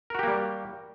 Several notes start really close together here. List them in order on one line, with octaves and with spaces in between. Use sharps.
A#4 F#4 G4 A#3 G3